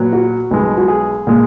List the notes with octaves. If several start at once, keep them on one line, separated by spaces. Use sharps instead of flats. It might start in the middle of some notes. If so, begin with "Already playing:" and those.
Already playing: A#2 F#3 B3
F#4
B1 B2 G#3
F#4
G#4
A#2 G#3